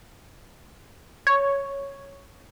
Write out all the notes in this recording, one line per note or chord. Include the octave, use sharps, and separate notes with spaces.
C#5